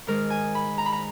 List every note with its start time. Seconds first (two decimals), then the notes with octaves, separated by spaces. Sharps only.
0.07 G#2 D#3 G#3 A#4
0.30 G#5
0.55 B5
0.78 A#5
0.86 B5
0.92 A#5